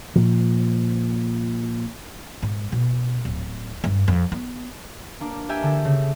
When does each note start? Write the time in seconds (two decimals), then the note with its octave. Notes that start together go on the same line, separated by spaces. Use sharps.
0.16 A#2 F3
2.42 G#2
2.72 B2
3.25 D1
3.84 G2
4.08 F2
4.32 B3
5.20 A#3 D4
5.49 G4 A#4 E5 G#5
5.63 D3 A4
5.85 C#3